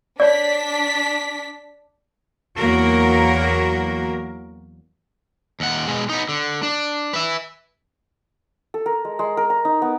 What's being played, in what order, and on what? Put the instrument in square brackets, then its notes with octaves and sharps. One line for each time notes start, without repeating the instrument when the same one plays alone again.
[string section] D4 B6 [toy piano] C#5 D5
[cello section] E2 F#3 A#3 F#4 A#4
[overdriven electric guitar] D#2 F#5
B2 G#3
B3 D#4
D3
D4
B4 E5
[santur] A4
A#4
G#3
G#3
A#4
A#5
D#4
B3